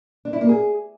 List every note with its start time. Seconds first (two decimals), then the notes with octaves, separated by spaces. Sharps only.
0.25 D4
0.33 E4
0.41 A#3
0.49 G#4